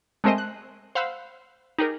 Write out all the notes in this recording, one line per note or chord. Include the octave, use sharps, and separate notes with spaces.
G#3 A3 C4 A#4 C5 D#5
F#6
C5 F5 F#5 B5 E6 F#6
D#4 G4 G#4 A#4